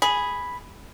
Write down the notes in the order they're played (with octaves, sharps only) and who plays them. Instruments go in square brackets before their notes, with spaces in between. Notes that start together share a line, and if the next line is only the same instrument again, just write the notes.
[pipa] G#4 [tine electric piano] B5